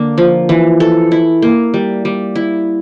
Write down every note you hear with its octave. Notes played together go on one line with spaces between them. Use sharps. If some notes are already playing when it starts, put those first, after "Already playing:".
Already playing: D3 A#3 D4
F3
E3
A4
E4
A#3
G3
G3
E4